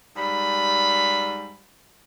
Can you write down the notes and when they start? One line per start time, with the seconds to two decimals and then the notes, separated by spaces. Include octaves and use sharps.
0.16 G#2 G3 B5